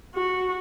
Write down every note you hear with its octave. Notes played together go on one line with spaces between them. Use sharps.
F#4